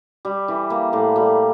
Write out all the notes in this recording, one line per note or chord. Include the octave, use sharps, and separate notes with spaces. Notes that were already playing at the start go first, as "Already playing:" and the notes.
G3
E3
A#3
A2
G3